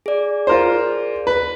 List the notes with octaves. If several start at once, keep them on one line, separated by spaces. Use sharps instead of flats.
G#4 D5
F4 A#4 C5
B4